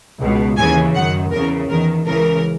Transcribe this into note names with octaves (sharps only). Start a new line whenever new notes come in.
C#2 B2
D#2 C#3 E3 G#5
F#2 D#3 F#5
E2 C#3 E3 A#4
E2 D#3 A#4
C#2 C#3 E3 A#4